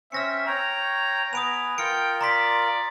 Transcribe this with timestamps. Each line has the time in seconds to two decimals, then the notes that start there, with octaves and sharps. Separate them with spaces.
0.12 C4 C#4 E5 F6 A#6 C#7
0.47 C#5 G5 A#5
1.33 B3 B4 G#5 D#6 D7 F7
1.78 F4 A#4 G5 F6 C#7 D7
2.21 D5 A#5 C6 B6